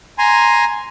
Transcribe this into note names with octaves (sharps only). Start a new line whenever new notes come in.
G#5 A#5 C6